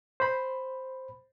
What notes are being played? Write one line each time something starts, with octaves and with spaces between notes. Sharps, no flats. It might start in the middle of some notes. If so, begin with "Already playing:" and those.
C5 B5